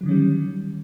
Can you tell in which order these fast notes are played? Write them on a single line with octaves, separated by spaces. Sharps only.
F#3 D3 D#3 C#4 G3